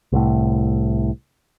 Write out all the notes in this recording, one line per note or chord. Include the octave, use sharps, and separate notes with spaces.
C2 A2